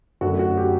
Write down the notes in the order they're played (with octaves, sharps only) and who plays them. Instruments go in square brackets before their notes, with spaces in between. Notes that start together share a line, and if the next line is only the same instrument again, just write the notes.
[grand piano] F#2 D3 F#3 A3 F#4
F#4
G4